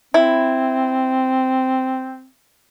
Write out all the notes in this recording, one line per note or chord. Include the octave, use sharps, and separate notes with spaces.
C4 E4